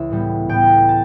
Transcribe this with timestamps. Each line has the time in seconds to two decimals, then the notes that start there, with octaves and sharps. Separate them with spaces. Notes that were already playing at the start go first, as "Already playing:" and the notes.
Already playing: C#2 E3 E5
0.10 A2 G3 B3
0.49 A2 G3 B3 G5
0.89 A5